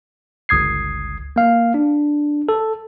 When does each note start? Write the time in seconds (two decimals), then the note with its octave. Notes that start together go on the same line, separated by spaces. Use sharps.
0.49 G1 C#2 D#6 G#6 C7
1.36 A#3 F5
1.74 D4
2.49 A4